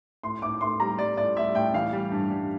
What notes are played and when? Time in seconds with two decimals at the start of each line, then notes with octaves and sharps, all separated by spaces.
0.23 A2 C6
0.42 A2 D6
0.61 A2 C6
0.80 G3 A#5
0.99 G3 D5
1.17 A2 D5
1.36 G3 E5
1.55 A2 G5
1.74 E3 F5
1.93 G3
2.12 G2
2.30 G3